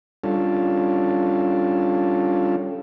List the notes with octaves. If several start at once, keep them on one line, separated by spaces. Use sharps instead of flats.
G3 C#4 D4 F4 A4